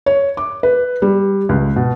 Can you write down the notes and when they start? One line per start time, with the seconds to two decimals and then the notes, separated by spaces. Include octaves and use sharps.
0.06 C#5
0.37 D6
0.63 B4
1.02 G3
1.49 C#2
1.76 B2